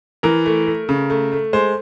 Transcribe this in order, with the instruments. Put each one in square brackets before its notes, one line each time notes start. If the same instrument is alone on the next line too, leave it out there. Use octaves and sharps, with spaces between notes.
[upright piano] E3 A#4
A3
A3
C#3
A3
A3
G#3 C5